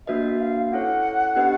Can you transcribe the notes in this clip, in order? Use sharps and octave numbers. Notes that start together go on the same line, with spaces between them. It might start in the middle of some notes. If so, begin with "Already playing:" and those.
A#3 D4 F#4 B4 D#5 E5
F5
C#4 E4 A4 C#5 F#5
B3 D4 G4 B4 D#5